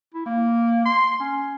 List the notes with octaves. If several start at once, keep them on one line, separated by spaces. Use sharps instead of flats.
E4
A#3
C6
C#4